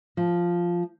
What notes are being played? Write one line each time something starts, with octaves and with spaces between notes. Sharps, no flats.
F3